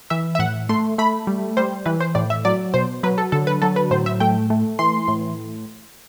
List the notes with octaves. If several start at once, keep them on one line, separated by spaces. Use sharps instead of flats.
E3 E5
E5
A2 F#5
A3 C6
A3 B5
G3
G3 C5
E3 B4
C5
A2 D5
E5
F#3 D5
B2 C5
F#3 B4
A4
D3 A4
B4
F#3 A4
B4
A2 C5
E5
A3 G5
A3
E3 C6
A2